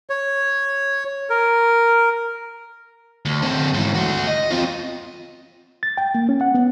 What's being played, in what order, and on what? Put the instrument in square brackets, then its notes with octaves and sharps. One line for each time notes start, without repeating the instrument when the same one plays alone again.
[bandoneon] C#5
A#4
[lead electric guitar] D2
D3 C4
G#2 E3
A3 F#4
D#5
C4 F4
[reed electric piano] A6
G5
A#3
C#4
F#5
B3